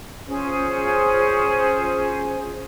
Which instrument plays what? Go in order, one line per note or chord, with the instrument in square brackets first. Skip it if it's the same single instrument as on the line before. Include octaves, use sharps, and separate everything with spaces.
[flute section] C#4 F4 G#4 C5